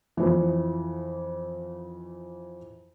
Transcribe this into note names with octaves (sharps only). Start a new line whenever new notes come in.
F2 E3